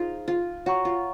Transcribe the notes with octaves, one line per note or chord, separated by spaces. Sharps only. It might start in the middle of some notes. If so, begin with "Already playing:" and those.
Already playing: D#4 F4 G#4 C5
F4
F#4 C#5 F#5 A#5 C#6
F4